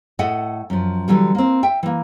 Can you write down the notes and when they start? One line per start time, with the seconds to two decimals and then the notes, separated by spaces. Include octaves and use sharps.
0.19 A2 A4 D#5 E5 F#5
0.70 F#2 F3
1.08 D3 E3 F#3 G3
1.35 A#3 C4
1.63 E5 G5
1.83 E3 A#3